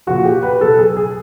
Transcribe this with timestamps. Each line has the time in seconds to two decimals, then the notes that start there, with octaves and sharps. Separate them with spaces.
0.07 A#2 F3 F#4
0.25 G4
0.43 B4
0.60 B2 F#3 A4
0.78 G#4
0.97 G#4